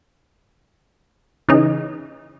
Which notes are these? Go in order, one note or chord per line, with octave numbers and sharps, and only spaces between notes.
C#3 E3 C#4 D#4